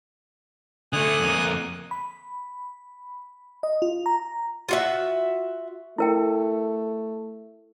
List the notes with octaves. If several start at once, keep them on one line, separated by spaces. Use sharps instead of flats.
D3 A3 G#5 D#6 F#6
F2 A#3
B5
D#5
F4
A#5
F4 F#4 E5
A3 E4 A#4 G5